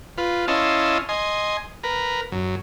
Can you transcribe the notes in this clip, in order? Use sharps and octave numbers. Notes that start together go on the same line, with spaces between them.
F4 B4
C#4 E4 D#5 F5 A5 C6
D#5 G#5 C6
A#4 B4
F#2